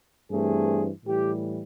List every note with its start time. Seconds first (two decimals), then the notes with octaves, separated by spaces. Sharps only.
0.31 G2 E3 A3 C4 G#4
1.05 A2 E3 G3 G4